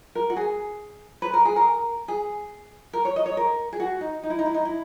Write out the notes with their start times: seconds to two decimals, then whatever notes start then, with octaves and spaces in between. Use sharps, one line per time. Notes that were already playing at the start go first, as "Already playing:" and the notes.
0.15 A#4
0.30 F#4
0.36 G#4
1.22 B4
1.34 A#4
1.45 G#4
1.56 A#4
2.08 G#4
2.93 A#4
3.05 C#5
3.16 D#5
3.26 C#5
3.37 A#4
3.73 G#4
3.80 F#4
4.01 D#4
4.23 D#4
4.30 E4
4.39 D#4
4.46 E4
4.54 D#4
4.65 E4